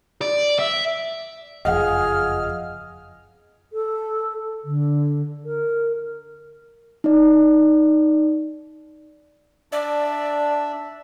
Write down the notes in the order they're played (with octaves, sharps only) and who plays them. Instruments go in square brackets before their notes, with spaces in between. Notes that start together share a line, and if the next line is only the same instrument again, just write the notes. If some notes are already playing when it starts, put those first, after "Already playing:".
[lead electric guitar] D5
E5
[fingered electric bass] F#1 F2 F3 [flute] G#4 [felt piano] D#5 F5 F#5 [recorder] F6
[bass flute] A4
D3
A#4
[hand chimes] D#4 D5
[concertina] D4 E5 [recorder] D5